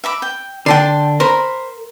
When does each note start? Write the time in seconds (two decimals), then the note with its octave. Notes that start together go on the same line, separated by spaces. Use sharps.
0.04 E5 B5 D6
0.22 G5
0.66 D3 D4 G5 A5 C6
1.20 A#4 C5 B5